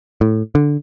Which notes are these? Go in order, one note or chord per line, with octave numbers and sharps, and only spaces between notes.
A2
D3